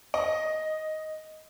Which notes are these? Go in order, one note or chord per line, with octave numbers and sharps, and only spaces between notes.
D#5